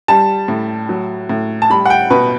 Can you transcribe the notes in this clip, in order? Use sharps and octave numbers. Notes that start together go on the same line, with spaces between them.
G3 A5
A2
F#3
A2
A5
G3 B5
F#5
G5
B2 B4